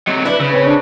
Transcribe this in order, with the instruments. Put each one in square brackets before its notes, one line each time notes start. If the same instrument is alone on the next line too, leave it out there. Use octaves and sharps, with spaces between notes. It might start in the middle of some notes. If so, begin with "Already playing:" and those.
[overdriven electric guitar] C3 F#3 [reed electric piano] D#5
[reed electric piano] D4 D5 E5 [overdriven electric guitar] E4 [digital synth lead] B4
[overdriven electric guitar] C#3 [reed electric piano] E6
[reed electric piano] C4 C5 C#5
[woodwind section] D4